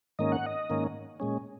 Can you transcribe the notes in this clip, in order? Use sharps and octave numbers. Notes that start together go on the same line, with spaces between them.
G#2 D#3 A#3 C#4 D#5
F#5
D#5
G#2 D#3 A#3 C#4
A#2 G#3 C#4